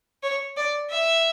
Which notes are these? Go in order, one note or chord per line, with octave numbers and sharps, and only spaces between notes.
C#5
D5
E5